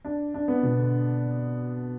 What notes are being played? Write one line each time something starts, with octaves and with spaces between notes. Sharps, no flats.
D4
D4
B3
B2
D3